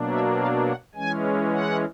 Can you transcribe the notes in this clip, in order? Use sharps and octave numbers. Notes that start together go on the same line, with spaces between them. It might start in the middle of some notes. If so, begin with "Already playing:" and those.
Already playing: B2 F#3 A#3 D4
E5
F5
F#5
E3 G#3 C#4 G#5
F#5